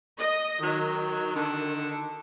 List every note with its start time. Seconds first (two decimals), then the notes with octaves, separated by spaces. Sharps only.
0.19 D#5
0.63 D#3 F#3
1.36 D3